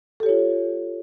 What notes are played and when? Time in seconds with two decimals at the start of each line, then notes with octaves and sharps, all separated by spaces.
0.20 A4
0.23 G4
0.26 C#5
0.29 F4